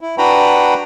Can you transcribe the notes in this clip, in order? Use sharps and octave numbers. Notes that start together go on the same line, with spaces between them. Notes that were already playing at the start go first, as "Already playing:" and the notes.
E4
D4 F#4 B4 G5 A#5 B5